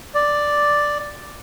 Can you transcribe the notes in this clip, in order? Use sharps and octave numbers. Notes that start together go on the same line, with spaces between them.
D5